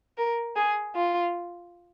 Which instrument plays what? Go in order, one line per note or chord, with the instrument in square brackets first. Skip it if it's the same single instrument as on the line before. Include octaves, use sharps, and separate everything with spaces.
[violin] A#4
G#4
F4